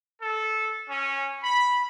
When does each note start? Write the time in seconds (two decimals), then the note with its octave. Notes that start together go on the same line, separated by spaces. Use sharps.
0.21 A4
0.88 C#4
1.44 B5